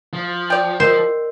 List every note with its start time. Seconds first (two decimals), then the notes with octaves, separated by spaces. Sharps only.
0.13 F3
0.50 D5 G5
0.80 A#4 C5 D#5 E6